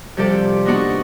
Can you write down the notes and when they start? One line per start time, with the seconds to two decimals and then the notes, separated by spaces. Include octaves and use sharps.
0.17 C3 F3 G3 G4 A4 D5
0.65 A#3 B3 D4 D#4 F#4 F#5